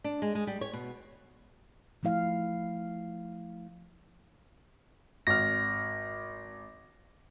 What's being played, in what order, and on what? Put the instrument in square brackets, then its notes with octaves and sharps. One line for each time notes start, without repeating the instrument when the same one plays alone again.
[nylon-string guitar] D4
G#3
G#3
G3
C#5
B2
[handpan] F3 A3 E4 F5
[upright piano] G#1 F6 [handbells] A#6